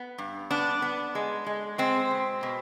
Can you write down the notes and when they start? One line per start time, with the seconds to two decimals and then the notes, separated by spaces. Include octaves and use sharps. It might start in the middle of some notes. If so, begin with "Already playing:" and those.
Already playing: B3
0.18 G2
0.50 B3 D4
0.82 B3
1.15 G#3
1.46 G#3
1.78 G#3 C4
2.11 B2
2.43 B2